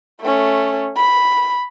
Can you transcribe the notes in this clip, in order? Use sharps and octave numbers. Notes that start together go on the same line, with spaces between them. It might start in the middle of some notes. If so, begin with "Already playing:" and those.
A3 C#4
B5